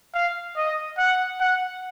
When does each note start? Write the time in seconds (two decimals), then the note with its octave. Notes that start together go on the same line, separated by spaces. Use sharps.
0.14 F5
0.57 D#5
0.98 F#5
1.40 F#5